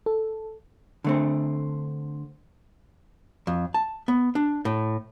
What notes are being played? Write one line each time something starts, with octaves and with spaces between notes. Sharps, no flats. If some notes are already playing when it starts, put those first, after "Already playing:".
A4
D3 A3 C4
F2
A5
B3
D4
A2